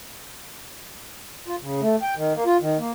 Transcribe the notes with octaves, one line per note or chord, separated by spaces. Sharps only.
F4
C#3
A3
G5
D#3
A#3
F4
D#3
A#3